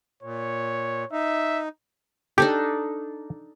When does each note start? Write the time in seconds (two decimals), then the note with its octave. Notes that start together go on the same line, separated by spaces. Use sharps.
0.23 A#2 C#5
1.12 D#4 E5
2.38 D4 D#4 G4 A4